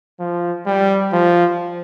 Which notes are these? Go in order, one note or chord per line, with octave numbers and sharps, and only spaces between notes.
F3
G3
F3